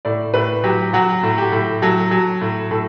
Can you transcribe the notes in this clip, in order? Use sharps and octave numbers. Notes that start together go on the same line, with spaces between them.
A2 D5
A2 B4
F#3 G4
F#3 F#4
A2
G4
A2
F#3 A4
F#3
A2
A2 A4